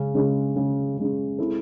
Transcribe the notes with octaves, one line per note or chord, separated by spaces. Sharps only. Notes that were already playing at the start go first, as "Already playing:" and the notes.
Already playing: C#3 G#3 C#4
C#3 G#3 C#4
C#3 G#3 C#4
C#3 G#3 C#4
G#3 C4 E4 A4